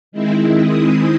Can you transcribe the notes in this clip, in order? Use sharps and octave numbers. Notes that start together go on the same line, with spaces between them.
D#3 G#3 C4 E4
D#6